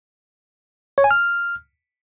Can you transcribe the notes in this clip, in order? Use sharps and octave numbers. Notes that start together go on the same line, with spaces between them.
C#5
G#5
F6